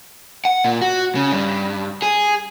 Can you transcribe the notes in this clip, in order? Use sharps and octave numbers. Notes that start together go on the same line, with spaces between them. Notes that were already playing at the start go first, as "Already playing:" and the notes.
F#5
A#2
F#4
C#3
G2
G#4